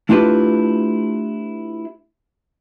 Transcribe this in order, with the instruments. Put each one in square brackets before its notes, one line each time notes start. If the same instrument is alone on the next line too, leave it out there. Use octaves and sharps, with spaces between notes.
[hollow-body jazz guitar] A3 D4 E4 F4 G4 B4